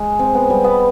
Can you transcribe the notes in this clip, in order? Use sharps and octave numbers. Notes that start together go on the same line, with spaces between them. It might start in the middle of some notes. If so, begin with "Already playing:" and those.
Already playing: G#3
C4
B3
G3
B3